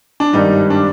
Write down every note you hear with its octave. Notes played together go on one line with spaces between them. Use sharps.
D4
G#1 G2 D#3 G3 D#4
D4